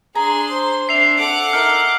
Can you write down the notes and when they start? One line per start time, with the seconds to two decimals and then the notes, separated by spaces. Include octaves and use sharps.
0.15 D4 G#4 A#5 C6
0.50 C5
0.89 C4 D4 E5 C7 F7
1.19 A4 F#5 D6 D7
1.53 D#4 A#4 E5 F6